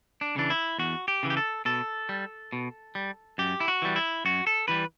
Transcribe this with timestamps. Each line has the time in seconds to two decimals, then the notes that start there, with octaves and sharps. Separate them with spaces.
0.21 D4
0.36 C#3 E3 D4
0.50 E4
0.78 E2 F#4
1.08 G4
1.23 C#3 E3
1.30 G4
1.37 A4
1.65 B2 A4
2.09 G3
2.52 B2
2.95 G3
3.38 F#2 G4
3.60 E4
3.68 F#4
3.82 E3 G3
3.96 E4
4.25 F#2 F#4
4.47 A4
4.68 E3 G3 B4